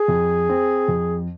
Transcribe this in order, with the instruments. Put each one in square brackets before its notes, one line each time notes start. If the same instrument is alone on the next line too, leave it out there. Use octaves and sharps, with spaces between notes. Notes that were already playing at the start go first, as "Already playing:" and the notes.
Already playing: [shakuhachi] G#4
[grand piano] F2
C4
F2